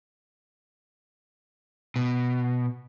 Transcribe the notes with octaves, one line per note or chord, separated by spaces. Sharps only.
B2